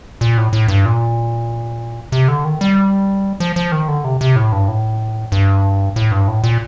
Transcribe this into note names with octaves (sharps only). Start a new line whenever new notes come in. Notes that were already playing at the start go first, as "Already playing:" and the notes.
A#2
A2
A2
G2
A#2
C3
D3
D#3
G3
F3
F3
D#3
D3
C3
C3
A2
G2
A2
G2
A2
G2
A2
A#2